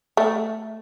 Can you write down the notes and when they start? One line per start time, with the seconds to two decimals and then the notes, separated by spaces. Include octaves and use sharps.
0.17 A3